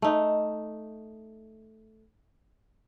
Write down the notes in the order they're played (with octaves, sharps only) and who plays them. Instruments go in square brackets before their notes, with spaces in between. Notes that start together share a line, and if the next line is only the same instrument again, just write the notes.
[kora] A3 D#4